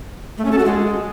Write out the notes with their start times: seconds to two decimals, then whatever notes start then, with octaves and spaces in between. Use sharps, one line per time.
0.38 A3
0.45 C#4
0.52 A4
0.58 F#4
0.65 G#3